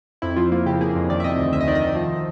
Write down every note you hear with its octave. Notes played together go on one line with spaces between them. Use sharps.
F2 E4
F3 F4
A#3
C#3 G4
A#3 G#4
F2
D#3 D5
E5
C3 D#5
D2
D2 E5
D#5
D#3 D5
D#5
D#3
F3